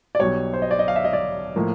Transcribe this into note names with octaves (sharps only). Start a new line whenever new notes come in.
D5
B1 B2 G3 C#5
C5
D#5
D5
D#5
F5
E5
D#5
D5
A2 F3 A#3